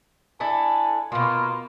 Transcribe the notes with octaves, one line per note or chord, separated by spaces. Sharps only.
D4 E4 A4 G#5
B2 A#3 F4